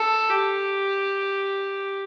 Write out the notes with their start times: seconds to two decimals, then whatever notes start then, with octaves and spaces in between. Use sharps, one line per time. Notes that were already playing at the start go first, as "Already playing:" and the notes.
Already playing: A4
0.29 G4